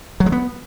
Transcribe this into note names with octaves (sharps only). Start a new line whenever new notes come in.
F#3
G#3
B3